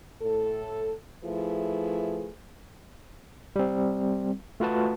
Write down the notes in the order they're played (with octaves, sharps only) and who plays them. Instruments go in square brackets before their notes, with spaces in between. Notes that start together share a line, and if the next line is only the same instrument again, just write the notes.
[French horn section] A2 A4
F3 A3 E4 G#4 B4
[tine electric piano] G3 C4
A3 F4 F#4 B4 A5